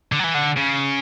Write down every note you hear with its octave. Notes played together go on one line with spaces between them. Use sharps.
D3
F#3
E3
D3
C#3